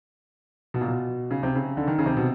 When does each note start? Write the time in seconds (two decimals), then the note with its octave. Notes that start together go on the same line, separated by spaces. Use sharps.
0.74 B2
0.81 A#2
0.88 B2
1.31 C#3
1.43 C3
1.55 C#3
1.77 D3
1.87 D#3
1.99 C#3
2.06 C3
2.17 B2